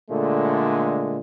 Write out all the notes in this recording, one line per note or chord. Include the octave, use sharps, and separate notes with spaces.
A#2 D3 G#3 A3